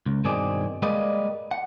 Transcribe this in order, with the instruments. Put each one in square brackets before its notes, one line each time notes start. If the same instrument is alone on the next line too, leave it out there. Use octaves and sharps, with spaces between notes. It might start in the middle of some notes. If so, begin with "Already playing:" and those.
[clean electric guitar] C#2
G2 B2 D#3 C4 G#4 D5
G3 G#3 A#3 B4 D5 D#5
F#5